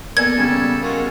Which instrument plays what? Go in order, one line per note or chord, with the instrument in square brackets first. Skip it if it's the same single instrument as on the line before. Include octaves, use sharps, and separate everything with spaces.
[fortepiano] A#3 D5 G#5 [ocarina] B3 [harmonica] A4 [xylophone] G#6
[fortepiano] C#3 G3
[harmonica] G#3 F4 F#4 [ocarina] A#4